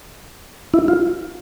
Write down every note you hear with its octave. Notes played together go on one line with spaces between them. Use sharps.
E4
F4